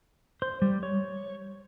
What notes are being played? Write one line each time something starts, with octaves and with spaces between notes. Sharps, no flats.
C5
G3
C#5